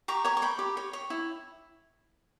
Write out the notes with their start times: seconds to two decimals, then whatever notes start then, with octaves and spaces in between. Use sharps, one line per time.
0.08 G4 A#5 C#6
0.25 C#5 A#5 C#6
0.37 C#6
0.42 C#5 G5 B5
0.59 G4
0.77 C#5
0.93 C#5
1.10 E4